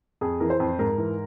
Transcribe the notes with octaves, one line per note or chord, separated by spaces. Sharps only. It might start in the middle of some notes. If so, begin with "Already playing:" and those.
F2 G#4
E3 A#4
C5
F2
G#2 A#4
E3